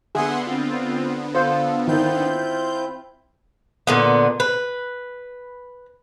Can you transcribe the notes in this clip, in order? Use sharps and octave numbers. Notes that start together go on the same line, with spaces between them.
D3 B3 G#4 E5 F#5 C6
C4 F4
F4 A4 C5
D#3 C4 E4 F4 G6
A#2 D3 B3
B4